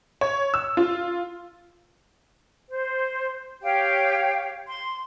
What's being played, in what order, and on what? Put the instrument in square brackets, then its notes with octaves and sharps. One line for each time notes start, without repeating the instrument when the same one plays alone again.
[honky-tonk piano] C#5
E6
F4
[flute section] C5
G4 C#5 F5 G5
C6